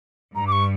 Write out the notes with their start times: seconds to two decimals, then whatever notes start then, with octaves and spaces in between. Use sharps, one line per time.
0.35 G2 A#5
0.47 D6
0.52 C#6